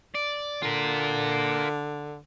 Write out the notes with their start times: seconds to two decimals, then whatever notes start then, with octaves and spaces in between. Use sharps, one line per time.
0.15 D5
0.62 D3 F4 A#4